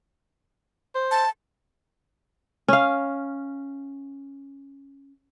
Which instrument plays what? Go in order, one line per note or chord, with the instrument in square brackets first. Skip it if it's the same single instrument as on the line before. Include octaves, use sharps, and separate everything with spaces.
[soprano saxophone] C5
[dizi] A5
[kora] C#4 F5